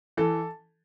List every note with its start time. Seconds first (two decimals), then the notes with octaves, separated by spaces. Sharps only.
0.17 E3 A4